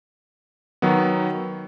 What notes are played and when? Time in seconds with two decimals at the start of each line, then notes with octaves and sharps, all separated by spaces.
0.82 D#3 F#3 B3